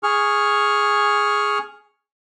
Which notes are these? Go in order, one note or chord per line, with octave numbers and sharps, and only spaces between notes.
G#4 C#6 F6